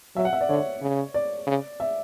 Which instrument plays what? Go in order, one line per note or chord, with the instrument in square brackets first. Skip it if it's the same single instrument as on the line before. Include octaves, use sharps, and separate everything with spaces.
[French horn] F#3 [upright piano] E5
[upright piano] F#5
E5
D5
[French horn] D3 [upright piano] C#5
[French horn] C#3
[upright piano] D5
[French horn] C#3
[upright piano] E5